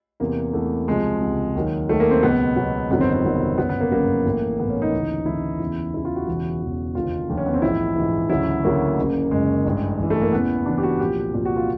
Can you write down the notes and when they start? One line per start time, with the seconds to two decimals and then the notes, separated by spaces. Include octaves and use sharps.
0.20 E2 C3 E3 A#3
0.53 E2 C3 E3 A3
0.87 C#2 C3 F3 G#3
1.21 C#2 C3 F3
1.55 D#2 D#3 F#3
1.89 D#2 D#3 F#3 A3
2.00 A#3
2.11 C4
2.22 C#2 B2 F#3 B3
2.56 C#2 B2 F#3
2.90 G1 F2 C3 D#3 F#3 B3
3.01 C4
3.13 C4
3.24 G1 F2 C3 D#3 F#3
3.58 G1 F#2 C#3 F#3 B3
3.69 B3
3.80 A#3
3.91 G1 F#2 C#3 F#3 A#3
4.25 A1 A2 E3
4.58 A1 A2 E3 B3
4.69 C#4
4.82 D#4
4.92 D2 C#3 E3
5.26 D2 C#3 E3 E4
5.60 E2 C#3 E3
5.94 E2 C#3 E3 E4
6.05 F4
6.16 F#4
6.27 E1 E2 C#3 E3
6.62 E1 E2 C#3 E3
6.95 F1 D#2 D3 F3 F4
7.29 F1 D#2 D3 F3
7.37 C#4
7.46 B3
7.54 C4
7.62 A#1 G#2 E3 E4
7.96 A#1 G#2 E3
8.30 D2 C#3 F#3 E4
8.64 D2 C#3 F#3 A#3
8.98 F#1 F#2 C#3
9.31 F#1 F#2 C#3 G#3
9.65 A1 G2 E3
9.99 A1 G2 E3
10.10 A3
10.21 A#3
10.33 E2 C#3 E3 B3
10.66 E2 C#3 E3 D4
10.78 G4
10.83 F#4
11.00 C2 A#2 F3 G4
11.34 C2 A#2 F3 G4
11.45 F#4
11.57 F4